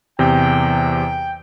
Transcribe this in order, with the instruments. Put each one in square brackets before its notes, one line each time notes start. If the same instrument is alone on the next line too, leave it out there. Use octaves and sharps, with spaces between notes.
[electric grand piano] E2 C3 [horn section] G5